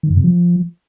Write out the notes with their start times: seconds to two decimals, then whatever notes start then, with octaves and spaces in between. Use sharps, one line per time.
0.03 D#3
0.10 F#2
0.17 C3
0.24 F3